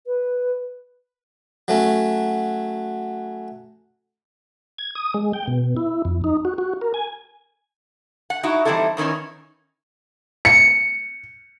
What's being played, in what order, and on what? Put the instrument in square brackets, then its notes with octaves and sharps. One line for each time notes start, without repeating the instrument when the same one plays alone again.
[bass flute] B4
[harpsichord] F#3 A3 C#4
[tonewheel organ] G#6
D#6
G#3
G5
B2
E4
F2
D#4
F#4
F#4
A#4
G#5
[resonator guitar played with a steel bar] F#5
D#4 E4 F#4
E3 G3 C4 D#4 E4 A4
E2 D#3 E3 C#4 D#4
[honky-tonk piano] C#7